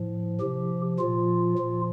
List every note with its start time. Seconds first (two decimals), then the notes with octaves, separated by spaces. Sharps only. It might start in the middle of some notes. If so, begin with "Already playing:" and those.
Already playing: A2 F3
0.40 C3 F3 G4
0.99 A#2 F3 F4
1.58 A#2 F3